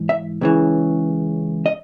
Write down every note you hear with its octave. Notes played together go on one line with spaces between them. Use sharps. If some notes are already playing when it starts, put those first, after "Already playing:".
Already playing: G#2 E3
E5
C#2 C#3 E3
D#5